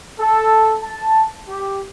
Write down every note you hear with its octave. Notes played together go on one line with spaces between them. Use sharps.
A4
A5
G4